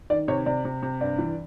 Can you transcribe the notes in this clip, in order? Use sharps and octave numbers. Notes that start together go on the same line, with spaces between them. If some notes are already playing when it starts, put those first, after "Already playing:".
D#3 D5
C3 C#5
C3 D5
C3
C3
G2 D5
E3